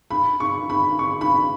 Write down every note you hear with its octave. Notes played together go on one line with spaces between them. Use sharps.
B5
C#6
B5
C#6
B5